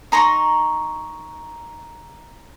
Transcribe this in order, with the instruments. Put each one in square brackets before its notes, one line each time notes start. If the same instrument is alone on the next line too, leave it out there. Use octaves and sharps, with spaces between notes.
[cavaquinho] D#4 A#5 C6 C#6